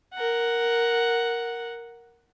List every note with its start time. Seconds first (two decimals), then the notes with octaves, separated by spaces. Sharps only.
0.14 A#4 F#5